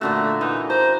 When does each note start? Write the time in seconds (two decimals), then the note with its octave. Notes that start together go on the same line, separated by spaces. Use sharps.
0.01 A#2 D3 A3 F#4
0.41 E3 D#4
0.70 C5 A#5